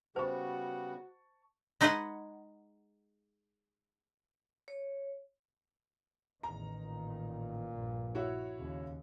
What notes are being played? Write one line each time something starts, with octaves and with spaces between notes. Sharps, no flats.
C#3 G3 B3 F#4 C5 A5 C#6
G#3 D#4 G#4 B4 D#5 F#5
C#5
A1 E2 D#3 A#5
A#2
A#1 G2
E4 F#4 C#5
D#2 C#3